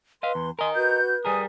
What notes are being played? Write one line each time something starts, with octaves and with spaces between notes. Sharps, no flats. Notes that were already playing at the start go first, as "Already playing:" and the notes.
B4 D#5 F5 C6
E2
A#4 D#5 G#5 C6
F#4 B4 G6
G3 G#4 A#4 G#5 D#6